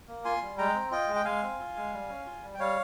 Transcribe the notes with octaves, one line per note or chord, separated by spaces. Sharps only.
A#3
F4 G#5 C6
G3
G#3 G5 A#5
C4
F4 D#5 G5
G#3
G5
G#3 F5 G#5
C4
F4
G#3
G3
C#4
F4
G3
G5
G3 C#5 F5